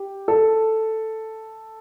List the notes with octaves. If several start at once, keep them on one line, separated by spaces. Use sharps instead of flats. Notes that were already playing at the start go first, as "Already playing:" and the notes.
Already playing: G4
A4